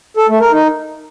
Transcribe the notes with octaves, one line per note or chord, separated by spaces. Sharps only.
A4
A3
A#4
D#4